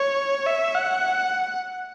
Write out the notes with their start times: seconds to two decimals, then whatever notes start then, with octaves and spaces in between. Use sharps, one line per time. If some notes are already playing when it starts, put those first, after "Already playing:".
Already playing: C#5
0.47 E5
0.75 F#5